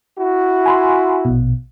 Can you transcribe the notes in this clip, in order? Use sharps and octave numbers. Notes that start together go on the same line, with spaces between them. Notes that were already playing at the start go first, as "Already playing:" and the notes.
E4 F#4
G#5 B5 C6
A#1 B2